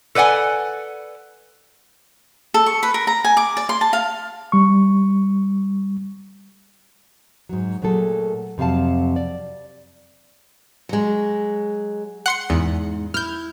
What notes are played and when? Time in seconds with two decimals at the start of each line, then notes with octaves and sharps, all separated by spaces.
0.15 A4 B4 D5 F#5 G#5
2.54 A4
2.66 C#6
2.83 B4
2.94 A#4
3.07 A#5
3.24 G#5
3.37 D6
3.57 D5
3.69 C6
3.81 A5
3.93 F5
4.52 G3 C#6
7.49 G#2 F#3
7.82 A#2 F#3 A3 G#4 A4
8.58 F2 C3 F#3 F5 A5
9.16 D5
10.89 F#3 G#3
12.26 F#5 C6 C#7
12.50 E2 G#2
13.14 E4 F6 G6